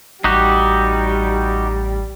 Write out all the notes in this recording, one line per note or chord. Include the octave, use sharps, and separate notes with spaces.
A1 G3 D#4 F#4 G4